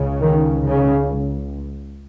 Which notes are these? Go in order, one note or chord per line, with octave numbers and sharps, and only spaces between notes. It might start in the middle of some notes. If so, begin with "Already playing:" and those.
Already playing: C#2 C#3
D#3
C#3